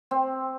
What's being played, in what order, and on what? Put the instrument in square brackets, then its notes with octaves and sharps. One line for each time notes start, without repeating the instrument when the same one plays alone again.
[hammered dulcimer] C4